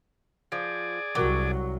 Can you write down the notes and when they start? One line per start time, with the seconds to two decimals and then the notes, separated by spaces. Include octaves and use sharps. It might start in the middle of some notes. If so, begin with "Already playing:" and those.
0.52 F3 G#4 D5
1.15 C2 C3 F#3 F#4 A#4 D6